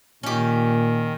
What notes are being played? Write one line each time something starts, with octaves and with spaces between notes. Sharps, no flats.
A#2 D#3 C#4 G4